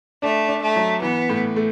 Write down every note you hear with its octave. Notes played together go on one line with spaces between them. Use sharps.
A3 D4
D4
A3
F#3
E3 B3
A2
A3